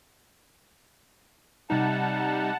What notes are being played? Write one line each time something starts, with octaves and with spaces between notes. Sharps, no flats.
C3 G3 D#4 F#5 A5